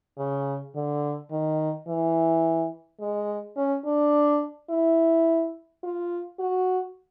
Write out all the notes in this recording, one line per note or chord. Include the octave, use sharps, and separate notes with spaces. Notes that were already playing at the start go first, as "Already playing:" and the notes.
C#3
D3
D#3
E3
G#3
C#4
D4
E4
F4
F#4